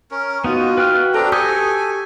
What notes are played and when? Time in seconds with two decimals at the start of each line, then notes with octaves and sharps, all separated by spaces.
0.11 C#4 A#4
0.44 B3 D#4 F4 F#4
0.77 B4 G5 F6
1.14 C4 D4 A4 A#5
1.32 G4 A4 G#5 C#6 D#6 G6